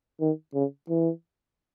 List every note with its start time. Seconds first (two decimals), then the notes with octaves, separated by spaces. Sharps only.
0.21 D#3
0.54 C#3
0.89 E3